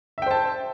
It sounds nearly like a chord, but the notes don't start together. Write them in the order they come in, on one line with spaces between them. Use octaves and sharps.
E5 G5 C5 A5